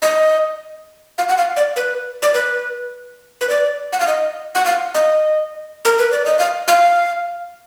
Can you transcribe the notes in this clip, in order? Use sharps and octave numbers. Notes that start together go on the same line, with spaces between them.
D#5
F5
F#5
F5
D5
B4
D5
B4
B4
D5
F#5
F5
D#5
F#5
F5
D#5
A#4
B4
D5
D#5
F5
F5